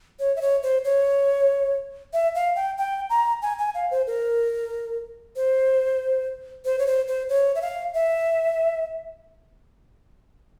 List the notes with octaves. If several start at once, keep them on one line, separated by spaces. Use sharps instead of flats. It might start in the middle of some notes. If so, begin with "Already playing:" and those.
C#5
E5
C#5
C5
C#5
E5
F5
G5
G5
A#5
G#5
G#5
F5
C5
A#4
C5
C5
C#5
C5
C5
C#5
E5
F5
E5